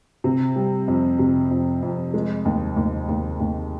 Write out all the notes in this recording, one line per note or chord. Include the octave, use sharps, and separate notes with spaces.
C3
G3
F2
C3
F2
F2
G#3
D#2
D#2
D#2
D#2